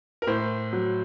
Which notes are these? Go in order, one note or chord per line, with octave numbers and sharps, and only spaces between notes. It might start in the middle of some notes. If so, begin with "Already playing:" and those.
A#4
A2 C5
F#3